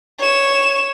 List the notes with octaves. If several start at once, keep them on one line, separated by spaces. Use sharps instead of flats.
C#5 E7